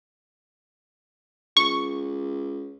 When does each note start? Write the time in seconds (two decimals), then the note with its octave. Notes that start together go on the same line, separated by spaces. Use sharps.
1.57 C#2 C#6